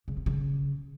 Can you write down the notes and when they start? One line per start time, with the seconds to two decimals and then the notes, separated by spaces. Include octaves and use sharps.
0.08 C#3
0.17 B3
0.26 C#3